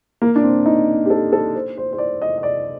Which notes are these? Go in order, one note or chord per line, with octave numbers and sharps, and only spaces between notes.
A#3
D4
C4
D#4
G4
A4
A4
C5
C5
C5
D5
D#5
D#5
D5